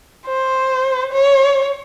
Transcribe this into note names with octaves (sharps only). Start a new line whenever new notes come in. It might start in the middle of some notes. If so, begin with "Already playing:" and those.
C5
C#5